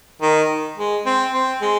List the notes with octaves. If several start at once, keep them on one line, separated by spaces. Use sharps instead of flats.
D#3
G#3
C4
C4
G#3